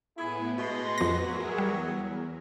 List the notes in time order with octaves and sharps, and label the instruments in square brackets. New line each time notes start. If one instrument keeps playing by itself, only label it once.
[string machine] A2 B3 [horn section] E4 G#4
[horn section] B2 G#3 C6 [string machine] B4 A#6
[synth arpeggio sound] F2 A#6 [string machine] F#4
[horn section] F#3 [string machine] G#4 A#4 E5
[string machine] E2 [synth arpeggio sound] G3